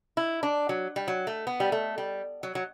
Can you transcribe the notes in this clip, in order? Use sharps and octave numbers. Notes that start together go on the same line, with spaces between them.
E4
D4
F#3
G3
F#3
A3
B3
G3
A3
G3
F#3
F#3